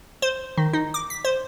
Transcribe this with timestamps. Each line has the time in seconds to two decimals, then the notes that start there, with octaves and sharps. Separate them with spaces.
0.22 C5
0.57 D#3
0.73 D#4
0.94 D6
1.10 B6
1.25 C5